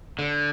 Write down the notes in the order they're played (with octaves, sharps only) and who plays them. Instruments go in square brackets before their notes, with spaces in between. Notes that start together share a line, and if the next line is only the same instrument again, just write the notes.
[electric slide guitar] D3